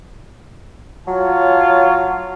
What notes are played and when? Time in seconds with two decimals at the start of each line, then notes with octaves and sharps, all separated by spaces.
1.07 F#3 F4 C#5 A5